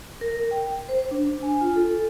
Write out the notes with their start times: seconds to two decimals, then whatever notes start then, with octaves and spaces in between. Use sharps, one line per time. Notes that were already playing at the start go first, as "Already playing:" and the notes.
0.21 A#4
0.51 G5
0.89 C5
1.11 D4
1.43 G#5
1.61 F4
1.76 A4